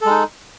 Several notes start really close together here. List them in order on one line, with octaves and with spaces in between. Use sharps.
A4 G#3 D#4